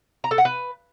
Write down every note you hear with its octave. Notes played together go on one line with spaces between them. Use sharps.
A#5
A4
F#5
B4